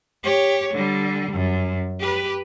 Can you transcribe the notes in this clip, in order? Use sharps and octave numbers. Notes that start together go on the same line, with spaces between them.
G4 C#5
D3 G3
F#2
G4 B4